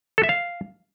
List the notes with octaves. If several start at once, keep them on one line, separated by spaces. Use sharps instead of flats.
A4
E5
F5